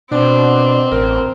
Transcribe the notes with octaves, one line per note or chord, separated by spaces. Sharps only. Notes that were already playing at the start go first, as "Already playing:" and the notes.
B2 C4 D4
A1 A#4